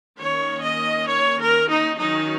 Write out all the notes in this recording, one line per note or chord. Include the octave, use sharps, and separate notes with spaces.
D#3 A#3 C#4 C#5
D#5
C#5
A#4
D#4
D#3 F#3 C#4 D#4